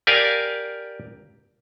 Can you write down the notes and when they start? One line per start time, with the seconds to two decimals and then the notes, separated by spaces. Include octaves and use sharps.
0.07 G4 A#4 D5 F5 G#5